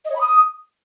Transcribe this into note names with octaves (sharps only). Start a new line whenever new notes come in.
D#5
C#5
B5
D#6